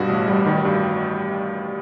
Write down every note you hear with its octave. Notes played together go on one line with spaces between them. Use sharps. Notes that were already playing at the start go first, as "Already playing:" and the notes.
Already playing: G2 B2 F#4
A1
G3
D#3
G2